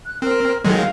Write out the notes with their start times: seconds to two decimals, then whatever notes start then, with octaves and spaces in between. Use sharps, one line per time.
0.06 F#6
0.22 C4 A#4
0.64 D#3 F#3 G#3 A4
0.77 F5